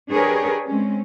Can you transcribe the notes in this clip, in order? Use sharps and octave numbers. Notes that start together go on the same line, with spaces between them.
D4 G4 G#4 A#4 B4 C#5
G#3 C4 C#4